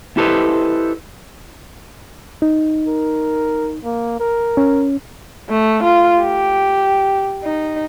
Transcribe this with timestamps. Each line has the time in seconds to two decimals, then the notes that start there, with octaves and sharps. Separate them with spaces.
0.17 E4 G4 A4 B4 C5 D#5
2.42 D#4
2.88 A#4
3.84 A#3
4.20 A#4
4.57 C#4
5.49 A3
5.83 F4
6.21 G4
7.43 D#4